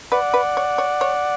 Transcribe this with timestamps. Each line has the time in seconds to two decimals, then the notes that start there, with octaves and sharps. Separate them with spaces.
0.12 B4 D5 F#5
0.34 B4
0.57 C#5
0.78 C#5
1.01 C#5